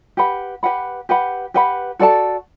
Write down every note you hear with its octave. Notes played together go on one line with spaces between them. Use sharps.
G4 B4 F#5 B5
G4 B4 F#5 B5
G4 B4 F#5 B5
G4 B4 F#5 B5
F#4 A4 D5 A5